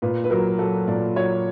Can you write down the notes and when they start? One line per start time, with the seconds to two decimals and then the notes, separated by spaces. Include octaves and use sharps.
0.02 A#2 B4
0.24 B4
0.30 F#3 A#4
0.58 F#3 A4
0.87 A#2 D5
1.16 F#3 C#5